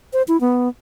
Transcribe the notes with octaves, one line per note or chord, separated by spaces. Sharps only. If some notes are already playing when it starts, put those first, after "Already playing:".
C5
E4
B3